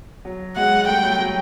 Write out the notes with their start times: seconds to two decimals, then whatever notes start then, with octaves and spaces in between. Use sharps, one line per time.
0.25 F#3
0.56 F#3 G#3 F#5
0.87 G3 A3 G5
1.03 F#3
1.19 F#3